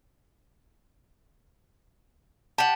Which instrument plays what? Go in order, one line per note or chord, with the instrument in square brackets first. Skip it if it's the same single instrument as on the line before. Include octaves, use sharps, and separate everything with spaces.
[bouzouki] G4 F#5 [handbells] A5